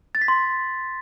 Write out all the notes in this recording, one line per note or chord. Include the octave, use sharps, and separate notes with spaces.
A6
B6
C6